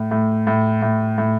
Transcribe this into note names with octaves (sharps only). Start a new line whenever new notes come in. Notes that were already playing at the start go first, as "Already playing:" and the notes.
Already playing: A2
A2
A2
A2
A2